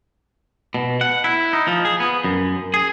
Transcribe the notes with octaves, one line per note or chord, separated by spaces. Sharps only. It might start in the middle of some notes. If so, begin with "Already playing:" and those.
B2
F#5
E4
D#4
F3
G#4
B3
F#2
G#4